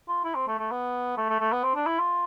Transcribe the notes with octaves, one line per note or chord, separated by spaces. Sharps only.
F4
E4
C4
A3
A3
B3
A3
A3
A3
B3
C4
D4
E4
F4